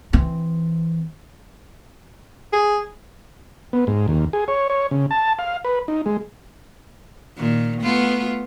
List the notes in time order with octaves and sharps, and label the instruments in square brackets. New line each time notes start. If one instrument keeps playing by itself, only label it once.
[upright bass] E3 C4
[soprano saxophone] G#4
[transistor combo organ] B3
G#2
D#2
G#4
C#5
C#5
C#3
A5
F5
B4
D#4
G#3
[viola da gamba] A#2 D#3
A3 B3 F4